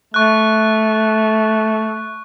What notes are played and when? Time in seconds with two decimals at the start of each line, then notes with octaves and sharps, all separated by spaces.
0.14 A3 C#6 F#6